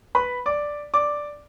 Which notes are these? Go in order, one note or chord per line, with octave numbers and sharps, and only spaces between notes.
B4 B5
D5 D6
D5 D6